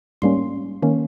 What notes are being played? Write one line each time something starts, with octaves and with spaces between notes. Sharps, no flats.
G#2 G3 A#3 C#4 C6
D#3 A#3 C#4